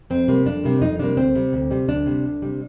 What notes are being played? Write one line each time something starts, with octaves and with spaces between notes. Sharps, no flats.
F2 C4
C3 G3 A#3
F2 D4
C3 G3 A#3
F2 D#4
C3 G3 A#3 D4
D2 C4
C3 G3
D2
C3 G3
D2 D4
C3 G3
D2
C3 G3